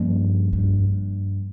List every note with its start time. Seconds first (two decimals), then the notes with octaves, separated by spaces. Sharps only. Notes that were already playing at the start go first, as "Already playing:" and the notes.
Already playing: G2 F3 A#3 C#4
0.53 G2